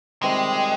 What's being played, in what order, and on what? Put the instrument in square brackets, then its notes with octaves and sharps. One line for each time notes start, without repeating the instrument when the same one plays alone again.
[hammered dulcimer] C3 D#3 G3 C4 [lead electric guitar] G#3